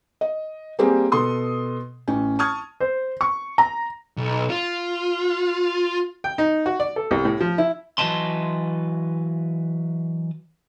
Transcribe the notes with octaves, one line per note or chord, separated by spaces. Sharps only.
D#5
G3 A#3 C4 G4 G#4
B2 A4 C6 D#6
A1 C#4
A5 C#6 D#6 F6 G#6
C5
C#6
A#5
B1
F4
G5
D#4
F#4
D5
A4
C2
A2
F3
E4
E3 F#3 B4 D#5 A5 C6